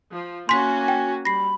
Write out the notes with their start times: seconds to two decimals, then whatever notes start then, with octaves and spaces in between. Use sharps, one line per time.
0.11 F3
0.49 A#3 C#4 F#4 G#5 C6 B6
0.88 G5
1.25 G3 B5 A#6 C7